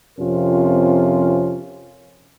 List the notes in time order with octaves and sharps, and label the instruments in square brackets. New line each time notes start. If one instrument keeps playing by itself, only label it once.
[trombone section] F2 C3 C#4 F4 A#4